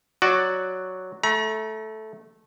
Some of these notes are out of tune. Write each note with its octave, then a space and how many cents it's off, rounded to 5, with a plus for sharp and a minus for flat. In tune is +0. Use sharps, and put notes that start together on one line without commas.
F#3 +0 F#4 +0 D5 +10
A3 -10 A#5 +40